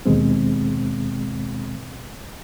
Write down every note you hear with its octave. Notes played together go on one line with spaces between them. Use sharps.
D#2 B2 G#3 C4